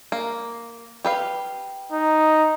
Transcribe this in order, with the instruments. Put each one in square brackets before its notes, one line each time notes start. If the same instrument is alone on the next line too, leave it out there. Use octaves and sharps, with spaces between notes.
[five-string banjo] A#3
G4 B4 F5
[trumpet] D#4